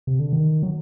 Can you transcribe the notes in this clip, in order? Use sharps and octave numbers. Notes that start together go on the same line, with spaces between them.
C3
D3
D#3
F#3